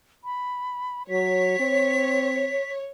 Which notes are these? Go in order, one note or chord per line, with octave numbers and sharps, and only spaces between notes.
B5
F#3 C#5 B6
C4